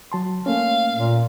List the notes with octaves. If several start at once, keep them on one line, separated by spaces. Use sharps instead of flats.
F#3 A5 C6
A3 A#3 C#4 F5
A#2